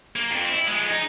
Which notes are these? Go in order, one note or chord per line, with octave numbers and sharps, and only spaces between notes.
A#3
F2 C4
E4
F3 G#3
D#4